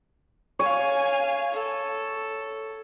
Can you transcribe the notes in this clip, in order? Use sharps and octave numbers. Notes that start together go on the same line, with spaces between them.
C#5 F5 G#5
A4